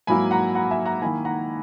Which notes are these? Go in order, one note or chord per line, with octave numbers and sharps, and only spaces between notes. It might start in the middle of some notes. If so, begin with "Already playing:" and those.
G#2 F#3 A#3 E4 G#5 B5
F#5 A#5
F#5 A#5
E5 G#5
F#5 A#5
D#3 A#3 E4 G#5 B5
F#5 A#5